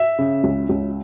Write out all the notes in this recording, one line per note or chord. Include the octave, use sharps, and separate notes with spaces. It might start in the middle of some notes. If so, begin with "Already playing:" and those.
Already playing: E5
C#3
C#2
C#2